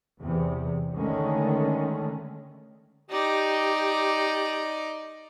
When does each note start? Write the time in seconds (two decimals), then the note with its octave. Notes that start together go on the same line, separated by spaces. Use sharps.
0.21 E2 C3
0.93 D3 D#3 G#3 A3 C#4
3.10 D#4 G4 D5